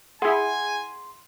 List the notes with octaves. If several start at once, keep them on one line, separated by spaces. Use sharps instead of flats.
E4 G#4 F#5 G#5 C6